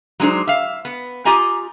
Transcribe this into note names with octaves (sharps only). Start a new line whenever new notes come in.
F#3 G#3 D4 D#4 C5
E5 F5
B3
F4 G4 D#5 G#5 A#5